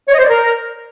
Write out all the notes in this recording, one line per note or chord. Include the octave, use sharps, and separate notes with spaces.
C#5
D#5
C5
D5
A#4